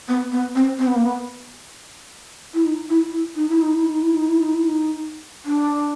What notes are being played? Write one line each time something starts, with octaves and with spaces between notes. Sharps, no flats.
B3
B3
C4
C4
B3
A#3
B3
E4
D#4
E4
E4
D#4
E4
D#4
E4
D#4
E4
D#4
E4
D#4
E4
D#4
D4